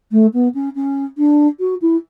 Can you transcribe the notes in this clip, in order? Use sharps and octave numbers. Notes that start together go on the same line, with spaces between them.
A3
B3
C#4
C#4
D4
F#4
E4